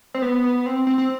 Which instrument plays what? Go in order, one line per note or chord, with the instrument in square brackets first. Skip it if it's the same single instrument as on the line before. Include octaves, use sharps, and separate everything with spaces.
[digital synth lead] C4
B3
B3
C4
C4
C4